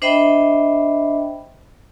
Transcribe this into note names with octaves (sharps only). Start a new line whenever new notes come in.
D4 C5 D#5 E5 G5 B5